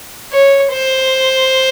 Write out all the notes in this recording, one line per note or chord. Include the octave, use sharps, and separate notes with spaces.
C#5
C5